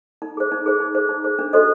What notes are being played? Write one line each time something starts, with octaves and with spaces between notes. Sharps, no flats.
D#4
G#4 C5
D#4
G#4 C5
D#4
G#4 C5
D#4
G#4 C5
D4
F#4 A4 C5 D#5